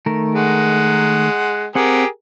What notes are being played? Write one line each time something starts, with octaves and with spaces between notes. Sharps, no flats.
D#3 A3 A#4
G#3 F#5
C4 G4 G#4 A#4 F#5